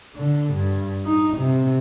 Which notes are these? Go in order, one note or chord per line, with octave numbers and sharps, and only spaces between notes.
D3
G2
D#4
C3